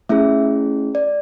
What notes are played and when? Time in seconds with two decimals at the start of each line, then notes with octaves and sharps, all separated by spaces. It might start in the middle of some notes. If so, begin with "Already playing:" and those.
0.09 A3 C#4 E4 G#4 E5
0.95 D5